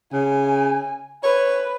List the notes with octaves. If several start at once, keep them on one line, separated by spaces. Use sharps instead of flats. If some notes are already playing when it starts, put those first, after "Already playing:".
C#3 G#5
B4 C#5